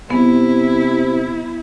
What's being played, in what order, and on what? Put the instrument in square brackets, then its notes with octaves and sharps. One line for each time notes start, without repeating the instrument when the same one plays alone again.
[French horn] C3 [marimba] B3 [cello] E4